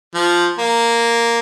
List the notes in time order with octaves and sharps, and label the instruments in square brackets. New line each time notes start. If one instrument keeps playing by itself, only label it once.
[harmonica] F3
A#3